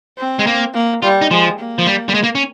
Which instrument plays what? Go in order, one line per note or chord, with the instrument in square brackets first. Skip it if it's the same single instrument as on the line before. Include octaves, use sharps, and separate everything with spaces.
[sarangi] C4
[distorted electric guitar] G#3
A#3
[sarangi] A#3
[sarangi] G3 [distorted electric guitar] F4
[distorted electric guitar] D#4
[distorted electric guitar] F3 [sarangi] G#3
[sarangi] A#3
[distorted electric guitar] F3
G3
G3
G#3
A#3
C#4